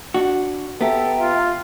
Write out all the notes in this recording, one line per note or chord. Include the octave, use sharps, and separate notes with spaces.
D4 F#4
B3 G4 A4 E5 G5 A#5
F4